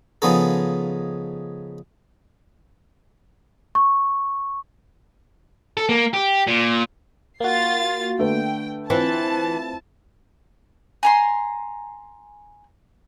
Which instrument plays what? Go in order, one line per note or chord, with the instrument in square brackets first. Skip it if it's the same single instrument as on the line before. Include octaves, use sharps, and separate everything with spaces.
[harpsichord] C#3 F3 G#3 B3 D#4 A4
[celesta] C#6
[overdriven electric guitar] A4
A#3
G4
A#2
[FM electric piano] A#3 F#4 [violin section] F4 A6 C7
[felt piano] D3 A3 B4 [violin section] G5
[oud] E3 [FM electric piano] C4 F4 [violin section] A5
[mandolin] G#5 A#5 C6